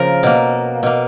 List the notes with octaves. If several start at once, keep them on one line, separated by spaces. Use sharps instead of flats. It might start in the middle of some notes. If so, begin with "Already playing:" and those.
Already playing: C#3 F3 A#3 A#4
B2 A#3
B2 A#3